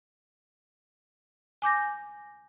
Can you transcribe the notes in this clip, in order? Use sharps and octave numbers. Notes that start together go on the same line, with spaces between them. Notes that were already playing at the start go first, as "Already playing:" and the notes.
G#5 D6 G6 A#6